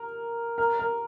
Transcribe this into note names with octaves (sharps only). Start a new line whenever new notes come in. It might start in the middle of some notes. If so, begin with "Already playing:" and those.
Already playing: A#4
A#4
A#4